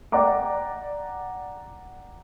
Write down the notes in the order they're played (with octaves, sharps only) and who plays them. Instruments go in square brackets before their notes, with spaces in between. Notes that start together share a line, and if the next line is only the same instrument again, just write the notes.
[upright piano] D5 F#5 G5 A#5 D6